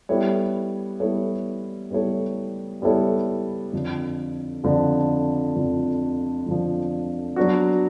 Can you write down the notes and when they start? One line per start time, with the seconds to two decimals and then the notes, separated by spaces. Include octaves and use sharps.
0.09 G3 B3 E4 A4 C#5
1.00 G3 B3 E4 A4 C#5
1.91 G3 B3 E4 A4 C#5
2.82 G3 B3 E4 A4 C#5
3.72 F2 D3 F3
4.64 F2 D3 F3
5.55 F2 D3 F3
6.46 F2 D3 F3
7.36 F#3 B3 D4 F#4